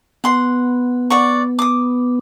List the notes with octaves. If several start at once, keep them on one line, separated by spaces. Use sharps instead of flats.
B3 F#5 C6
D5 F#5 C#6
D6 D#6